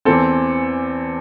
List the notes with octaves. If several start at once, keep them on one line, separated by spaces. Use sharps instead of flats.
E2 E3 C4 A4